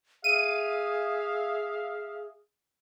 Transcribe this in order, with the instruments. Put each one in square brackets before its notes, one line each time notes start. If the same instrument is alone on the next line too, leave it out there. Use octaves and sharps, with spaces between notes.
[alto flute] G#4 [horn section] E5 F5 [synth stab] D#7